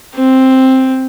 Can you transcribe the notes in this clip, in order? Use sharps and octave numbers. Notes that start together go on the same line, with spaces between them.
C4